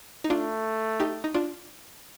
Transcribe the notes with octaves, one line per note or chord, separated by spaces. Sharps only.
D#4
A3 D4 F4
D#4 G4
D#4
D4 F4